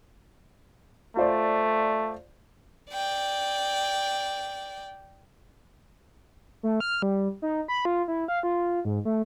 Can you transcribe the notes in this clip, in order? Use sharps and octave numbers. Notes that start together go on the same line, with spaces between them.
A3 F4 C5 D5
D5 G5
A3
F6
G3
D#4
B5
F4
E4
F5
F4
G#2
A3